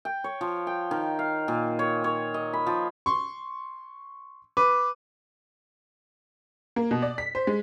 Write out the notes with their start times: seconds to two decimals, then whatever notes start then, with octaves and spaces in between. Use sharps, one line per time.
0.05 G5
0.24 C#5
0.41 F3
0.67 G5
0.91 D#3
1.19 F5
1.48 A#2
1.79 C#5
2.04 C#5
2.34 D#5
2.53 B5
2.66 F3
3.06 C6 C#6
4.57 B4 D6
6.76 A#3
6.91 B2
7.02 D5
7.18 B6
7.35 C5
7.47 G#3